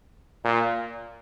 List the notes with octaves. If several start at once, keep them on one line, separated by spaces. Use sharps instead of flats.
A#2